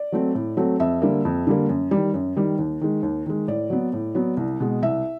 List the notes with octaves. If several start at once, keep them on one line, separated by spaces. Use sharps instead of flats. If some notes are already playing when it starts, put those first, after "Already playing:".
Already playing: D5
F#3 A3 C4
A2
F#3 A3 C4
F2 E5
D3 G3 A#3
F2
D3 G3 A#3
F#2
G3
D#3
F#2
D#3 G3
D#2
D#3 G#3
D#2
D#3 G#3
A2 D5
F#3 B3
A2
F#3 B3
C2
B2 G#3
C2 E5